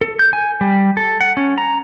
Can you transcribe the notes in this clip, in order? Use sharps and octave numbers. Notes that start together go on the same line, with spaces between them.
A4
G6
G#5
G3
A4
F#5
C#4
A#5